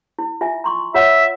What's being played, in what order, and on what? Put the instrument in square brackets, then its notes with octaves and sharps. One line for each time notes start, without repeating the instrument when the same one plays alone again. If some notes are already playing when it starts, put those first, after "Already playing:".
[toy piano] E4
F4 E5 G#5
A#5 C6 C#6
[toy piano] F4 C#5 F#5 [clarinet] E5